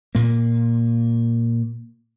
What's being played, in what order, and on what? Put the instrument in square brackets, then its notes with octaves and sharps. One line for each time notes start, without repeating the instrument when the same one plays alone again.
[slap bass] A#2 A#3